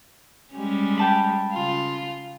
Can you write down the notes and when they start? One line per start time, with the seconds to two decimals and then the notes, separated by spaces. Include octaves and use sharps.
0.54 G3 G#3 C#4
0.97 G5 A5 B5
1.53 C#3 F4